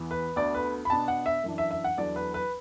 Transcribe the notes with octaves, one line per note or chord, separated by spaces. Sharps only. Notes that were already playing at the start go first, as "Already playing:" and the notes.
Already playing: E2 E3 B3
B4
D2 D3 B3 D5
B4
B5
B2 B3 D4 A5
F#5
E5
F#2 E3 D4
E5
E5
F#5
E2 D3 F#3 D4 D5
B4
B4